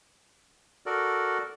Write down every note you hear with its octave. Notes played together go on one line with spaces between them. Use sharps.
F#4 A4 A#4 D5